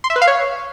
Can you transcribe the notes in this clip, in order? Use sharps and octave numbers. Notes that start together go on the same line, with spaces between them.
C6
E5
B4
F5
C#5